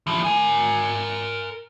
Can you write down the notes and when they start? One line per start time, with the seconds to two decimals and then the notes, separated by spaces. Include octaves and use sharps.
0.07 E3 F3
0.24 A#4 G#5